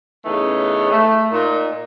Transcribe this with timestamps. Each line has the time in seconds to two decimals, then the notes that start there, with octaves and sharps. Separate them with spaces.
0.25 C#3 E3 A3 B3 C#4 D#4
0.91 A3
1.31 A#2 D#4